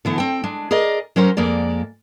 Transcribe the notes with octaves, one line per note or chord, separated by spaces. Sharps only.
D3 E3 B3 E4
C4 G5
G#3 D4
G#4 A#4 D5 D#5
F#3 C#4 A#4 C5
F2 G#3 A#3 D5